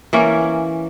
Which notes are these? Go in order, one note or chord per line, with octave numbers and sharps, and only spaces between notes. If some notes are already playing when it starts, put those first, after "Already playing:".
E3 A#3 C#4